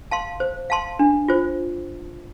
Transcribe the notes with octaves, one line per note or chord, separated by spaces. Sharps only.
F5 A5 C6
C5
F5 A5 C6
D4
F4 C5